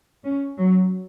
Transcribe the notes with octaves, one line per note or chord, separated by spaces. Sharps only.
C#4
F#3